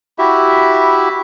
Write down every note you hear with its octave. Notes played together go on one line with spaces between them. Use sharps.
E4 F#4 G4 E5